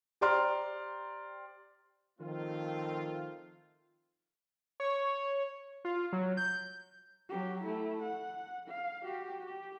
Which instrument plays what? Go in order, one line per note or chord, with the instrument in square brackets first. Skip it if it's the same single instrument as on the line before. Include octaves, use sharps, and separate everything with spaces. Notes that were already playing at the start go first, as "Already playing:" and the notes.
[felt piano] G4 C5 D5 A#5 C6 F6
[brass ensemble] D#3 F3 A3 C4 F4
[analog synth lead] C#5
F4
F#3
G6
[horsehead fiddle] F#3 G4
A3 E4
F#5
F5
F#4 G4
G4